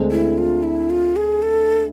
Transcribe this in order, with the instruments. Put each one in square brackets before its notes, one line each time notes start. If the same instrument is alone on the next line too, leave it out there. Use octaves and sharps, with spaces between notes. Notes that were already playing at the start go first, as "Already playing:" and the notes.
Already playing: [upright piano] D2 D3 G#3 C4
[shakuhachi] E4
F4
E4
F4
G#4
A4